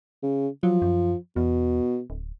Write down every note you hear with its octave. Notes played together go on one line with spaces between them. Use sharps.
C#3
F3 F#3
F#2
E2 B2
D1